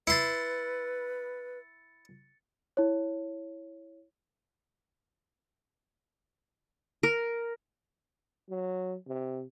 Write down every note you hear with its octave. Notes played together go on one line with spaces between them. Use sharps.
E4 B4 C6 A6 C#7
E4 C#5
A#4
F#3
C3